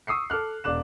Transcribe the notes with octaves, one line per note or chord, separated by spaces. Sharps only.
C#6 D#6 E6 C7 C#7
A4 D6 F6 F#6
E1 D5 D6 F#6 E7